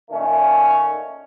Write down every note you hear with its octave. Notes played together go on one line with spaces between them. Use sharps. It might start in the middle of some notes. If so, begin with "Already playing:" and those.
A#2 D#3 A3 C#4